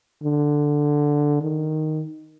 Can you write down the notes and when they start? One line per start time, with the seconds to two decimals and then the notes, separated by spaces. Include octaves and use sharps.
0.23 D3
1.41 D#3